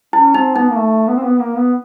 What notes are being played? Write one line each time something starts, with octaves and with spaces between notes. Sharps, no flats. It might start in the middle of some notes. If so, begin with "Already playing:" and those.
C#4 E4
C4 D#4
B3 D#4
A#3
A3
B3
C4
B3
A#3
B3